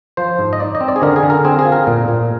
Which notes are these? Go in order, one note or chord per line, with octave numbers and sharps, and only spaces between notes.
F3 C5
G#2
D#5
D#4 D5
D#5
C4
D5
G#4
D3 A#4
G#4
D3
A#4
C4 G#4
G#4
F4
A#4
A#2
A#2